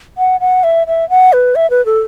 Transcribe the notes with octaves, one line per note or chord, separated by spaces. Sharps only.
F#5
F#5
E5
E5
F#5
B4
E5
B4
A4